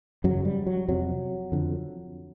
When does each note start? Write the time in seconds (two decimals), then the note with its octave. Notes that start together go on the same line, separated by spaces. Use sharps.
0.24 F#2 C#3 F#3
0.45 G3
0.67 F#3
0.88 F2 C3 F#3
1.52 F2 D3